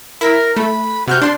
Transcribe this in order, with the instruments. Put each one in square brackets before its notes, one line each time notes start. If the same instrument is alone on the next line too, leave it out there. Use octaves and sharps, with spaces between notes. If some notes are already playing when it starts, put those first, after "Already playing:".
[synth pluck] E4 B6 [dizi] A#4
[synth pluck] A3 [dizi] B5
[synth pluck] C3 F6 G6 [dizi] F#4
[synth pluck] D4 C6 [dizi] D5